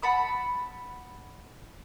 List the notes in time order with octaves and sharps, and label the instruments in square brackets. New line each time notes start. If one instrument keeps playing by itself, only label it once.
[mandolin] F#5 A5 B5 E6